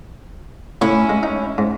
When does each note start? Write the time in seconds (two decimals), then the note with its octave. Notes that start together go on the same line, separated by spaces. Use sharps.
0.81 A2 C#4 E4
1.09 G#3
1.23 D#4
1.58 G#2